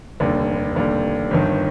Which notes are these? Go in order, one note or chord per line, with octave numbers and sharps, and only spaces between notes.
F1 D#2 D3 G3
F1 D#2 D3 G3
G1 G2 D#3